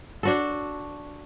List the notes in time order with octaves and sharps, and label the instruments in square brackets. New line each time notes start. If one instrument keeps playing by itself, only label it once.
[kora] D4 F#4 A4